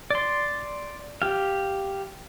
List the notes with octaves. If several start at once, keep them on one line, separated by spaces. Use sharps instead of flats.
D5 C6
G4 F5